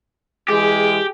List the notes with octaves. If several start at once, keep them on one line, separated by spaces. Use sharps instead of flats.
E3 G#3 G4 G#4